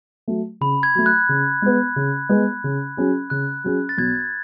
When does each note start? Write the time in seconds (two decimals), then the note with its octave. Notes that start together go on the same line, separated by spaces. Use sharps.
0.28 F#3 A3
0.61 C#3 B5
0.83 G#6
0.95 F#3 A3
1.06 F#6
1.29 C#3
1.62 G#3 B3
1.96 C#3
2.29 G#3 B3
2.64 C#3
2.97 F#3 C#4 G#4
3.30 C#3 F#6
3.64 F#3 C#4 G#4
3.89 A6
3.98 B1 G#6